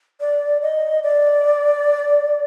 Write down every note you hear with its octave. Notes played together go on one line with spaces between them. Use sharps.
D5
D#5
D5